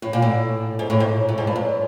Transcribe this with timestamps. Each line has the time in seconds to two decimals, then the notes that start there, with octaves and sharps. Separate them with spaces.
0.02 A2
0.13 A#2
0.22 A2
0.79 G#2
0.90 A2
1.00 G#2
1.29 A2
1.38 G#2
1.47 G2
1.56 F#2